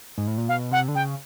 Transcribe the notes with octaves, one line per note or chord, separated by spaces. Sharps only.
G#2
A2
A#2
B2 F5
C3 F#5
D3
C#3 G5